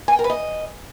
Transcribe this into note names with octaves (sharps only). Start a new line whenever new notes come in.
G#5
G5
A#4
B4
D#5